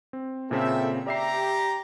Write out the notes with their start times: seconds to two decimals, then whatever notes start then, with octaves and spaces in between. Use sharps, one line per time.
0.13 C4
0.51 A#2 C#3 C4 A4 E5 G5
1.07 G4 D5 E5 A#5 C7